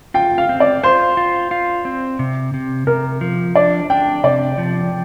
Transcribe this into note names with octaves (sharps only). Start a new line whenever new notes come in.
F4 G5
F5
C4
D5
F4 C5
F4
F4
C4
C3
C3
C3 A#4
F3
D4 D5
D4 G5
C3 D5
F3